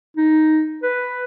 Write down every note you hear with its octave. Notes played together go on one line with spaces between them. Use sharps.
D#4
B4